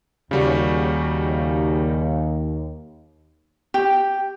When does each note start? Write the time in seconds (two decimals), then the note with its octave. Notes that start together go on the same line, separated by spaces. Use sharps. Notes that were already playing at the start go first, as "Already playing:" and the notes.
0.31 D#2 C#3 G3 F#4
3.74 G4